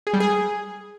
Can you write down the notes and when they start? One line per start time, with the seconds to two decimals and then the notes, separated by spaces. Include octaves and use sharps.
0.07 G#4
0.13 G3
0.20 G#4